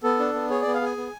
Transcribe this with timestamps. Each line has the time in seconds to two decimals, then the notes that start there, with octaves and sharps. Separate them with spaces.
0.03 B3 A4
0.19 D4
0.34 B3
0.50 G#4 C#5
0.62 B3 D5
0.74 F5
0.81 G#4 G#5
0.97 B3